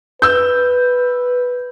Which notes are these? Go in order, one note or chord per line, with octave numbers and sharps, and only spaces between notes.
B4 E6 G6